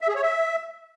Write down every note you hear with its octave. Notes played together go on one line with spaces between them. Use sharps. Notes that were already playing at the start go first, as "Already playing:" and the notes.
E5
G#4
C#5
E5